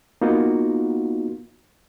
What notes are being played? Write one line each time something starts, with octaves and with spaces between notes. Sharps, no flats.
A#3 B3 D#4 F4 F#4